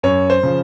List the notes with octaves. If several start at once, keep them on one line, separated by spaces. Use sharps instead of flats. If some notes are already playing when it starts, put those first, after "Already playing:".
F#2 C#5
C5
C#3 F3